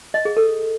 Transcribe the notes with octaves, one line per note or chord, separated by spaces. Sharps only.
D#5
G#4
A4